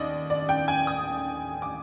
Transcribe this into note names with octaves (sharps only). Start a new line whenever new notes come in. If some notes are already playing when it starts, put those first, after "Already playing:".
Already playing: D#2 D5 D#5
D5
G5
G#5
D#6
D6